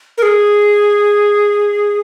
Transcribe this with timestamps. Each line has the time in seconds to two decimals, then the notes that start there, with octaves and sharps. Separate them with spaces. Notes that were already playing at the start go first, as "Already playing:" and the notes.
0.18 A#4
0.23 G#4